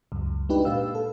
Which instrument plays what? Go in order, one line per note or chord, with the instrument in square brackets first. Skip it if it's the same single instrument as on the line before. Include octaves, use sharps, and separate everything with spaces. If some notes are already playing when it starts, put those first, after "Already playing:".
[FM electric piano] C#2 F#2
G#3 D4 D#4 G4 B4
A#2 B4 F5 E6
A4